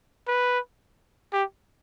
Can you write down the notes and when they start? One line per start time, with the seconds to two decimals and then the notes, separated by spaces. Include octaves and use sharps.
0.28 B4
1.33 G4